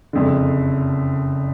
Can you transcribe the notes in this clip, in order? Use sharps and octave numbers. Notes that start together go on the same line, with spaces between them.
F#1 F2 D3